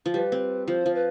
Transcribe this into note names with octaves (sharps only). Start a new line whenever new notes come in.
F3
G3 B4
C4
F3 C5
F3
B4